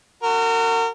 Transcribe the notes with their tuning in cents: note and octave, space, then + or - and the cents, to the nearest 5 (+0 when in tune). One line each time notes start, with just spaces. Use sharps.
F#4 +0 A#4 -35